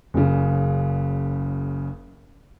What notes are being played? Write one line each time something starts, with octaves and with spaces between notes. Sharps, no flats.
F#1 C#3